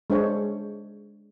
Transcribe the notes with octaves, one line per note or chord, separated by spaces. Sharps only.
G#3 D4 C5 C#5